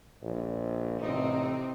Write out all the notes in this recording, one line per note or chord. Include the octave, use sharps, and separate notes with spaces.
A#1
A1 C3 C4 D#4